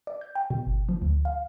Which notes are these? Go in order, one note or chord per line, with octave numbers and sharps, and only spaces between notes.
D5
G6
G5
B2
G1
F3
D2
F5